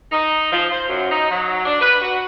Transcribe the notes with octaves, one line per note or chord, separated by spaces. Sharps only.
D#4
F3
C5
F#2
D#4
F#3
D4
B4
F#4